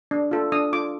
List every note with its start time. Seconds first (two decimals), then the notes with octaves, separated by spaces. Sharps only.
0.11 D4
0.31 F4 A4
0.52 D4 D#6
0.73 F4 A4 D6